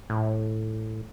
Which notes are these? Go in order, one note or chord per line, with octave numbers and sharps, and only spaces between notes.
A2